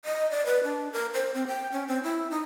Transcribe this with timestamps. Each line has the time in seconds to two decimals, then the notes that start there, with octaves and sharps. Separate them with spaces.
0.05 D#5
0.31 D5
0.46 B4
0.64 D4
0.93 A#4
1.14 C5
1.34 C4
1.47 G5
1.72 C#4
1.87 C4
2.03 E4
2.31 D#4